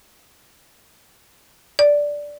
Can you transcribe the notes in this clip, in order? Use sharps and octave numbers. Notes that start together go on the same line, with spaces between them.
D5